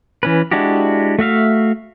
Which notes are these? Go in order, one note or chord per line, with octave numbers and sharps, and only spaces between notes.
E3 C#4 B4
G#3 D4 E4 F#4 G4
A3 F#4 E5 F5